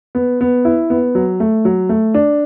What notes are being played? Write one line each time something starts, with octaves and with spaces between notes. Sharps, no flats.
B3
B3
E4
B3
F#3
A3
F#3
A3
D4